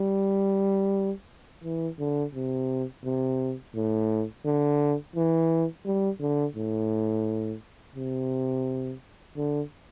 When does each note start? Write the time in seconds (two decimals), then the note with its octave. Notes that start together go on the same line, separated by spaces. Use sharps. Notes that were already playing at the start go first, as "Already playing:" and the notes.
Already playing: G3
1.64 E3
1.99 D3
2.34 C3
3.04 C3
3.75 A2
4.45 D3
5.16 E3
5.85 G3
6.21 D3
6.56 A2
7.95 C3
9.36 D3